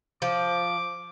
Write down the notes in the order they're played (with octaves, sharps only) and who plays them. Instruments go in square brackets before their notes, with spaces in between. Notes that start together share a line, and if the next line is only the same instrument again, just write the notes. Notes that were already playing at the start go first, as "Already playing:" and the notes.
[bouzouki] F3 [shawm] D6